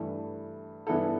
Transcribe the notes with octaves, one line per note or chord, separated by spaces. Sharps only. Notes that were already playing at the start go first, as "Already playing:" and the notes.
Already playing: G2 E3 A3
G2 E3 B3 E4 A4